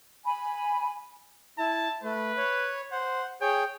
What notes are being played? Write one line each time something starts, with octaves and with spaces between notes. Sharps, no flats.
G#5 B5
E4 A5
A3 B4
C#5
C5 F#5
G#4 C#5 G5